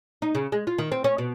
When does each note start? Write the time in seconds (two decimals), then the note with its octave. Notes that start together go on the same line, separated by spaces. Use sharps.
0.22 D#4
0.35 C#3
0.52 G#3
0.67 F4
0.78 D#3
0.92 C4
1.04 C#4
1.18 B2